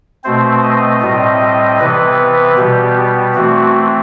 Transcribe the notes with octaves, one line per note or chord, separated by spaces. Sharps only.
B2 A3 C4 C5
D#5
A2 G3 C4
C3 E3 B3 B4
B2 G3 B3 G4
E3 A3 C4 F#4